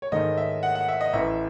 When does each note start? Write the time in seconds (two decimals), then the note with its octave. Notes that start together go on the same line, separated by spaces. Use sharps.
0.02 C#5
0.12 G#2 D#3 A3 C#4 D#5
0.37 E5
0.63 F#5
0.75 F#5
0.88 E5
1.01 D#5
1.13 A1 A2 E3 E5